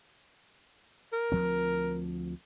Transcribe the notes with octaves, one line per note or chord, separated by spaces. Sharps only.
A#4
D2 F3 C4